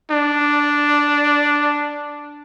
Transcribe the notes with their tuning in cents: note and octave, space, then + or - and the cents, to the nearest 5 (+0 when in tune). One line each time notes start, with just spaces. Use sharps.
D4 -5